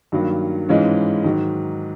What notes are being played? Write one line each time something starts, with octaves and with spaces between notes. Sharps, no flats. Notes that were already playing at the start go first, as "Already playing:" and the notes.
G2 D#3 F#3 A#3
G#2 E3 G#3 C#4 F4
G#2 D#3 F#3